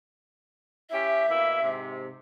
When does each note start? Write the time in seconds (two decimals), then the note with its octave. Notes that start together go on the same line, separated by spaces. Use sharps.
0.90 C#4 E4 G4 E5
1.28 B2 A#3 E4
1.62 G#2 C3